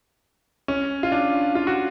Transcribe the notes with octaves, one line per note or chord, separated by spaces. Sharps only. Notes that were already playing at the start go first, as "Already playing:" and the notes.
C#4
F4
D4
F4
F#4